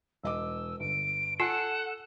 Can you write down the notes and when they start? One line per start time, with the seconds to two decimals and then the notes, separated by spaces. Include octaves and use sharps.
0.24 E1 D#5 D6 E6
0.80 G1 D7
1.40 F4 A4 F#5 G#5 E6